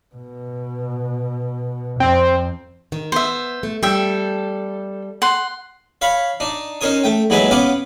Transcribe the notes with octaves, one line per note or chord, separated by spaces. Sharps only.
B2
F2 C4
D#3
B3 C5 E5
A3
G3 A4 E5 G5
F#5 C6
C#5 F5 B5 C#6
D4 D#4
C#4 D#4 A#4 C5 C#5 D#6
A3 G5
D#2 F#3 G#3 G#4 B4 E5
B3 C#4 F5 F#5 D6